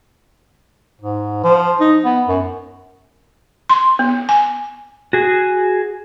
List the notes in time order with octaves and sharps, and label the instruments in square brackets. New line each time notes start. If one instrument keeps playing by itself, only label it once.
[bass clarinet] G#2
F3
D#4
B3
F#2
[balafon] C6
B3
G#5
[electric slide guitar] F#4 G#4